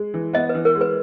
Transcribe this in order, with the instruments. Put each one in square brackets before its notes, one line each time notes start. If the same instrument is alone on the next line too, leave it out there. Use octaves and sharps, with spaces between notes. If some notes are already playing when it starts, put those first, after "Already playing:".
Already playing: [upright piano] G#3
E3
[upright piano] B3 [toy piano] D#5
[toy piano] B4
[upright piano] E3
[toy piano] A#4
[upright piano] G#3
[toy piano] B4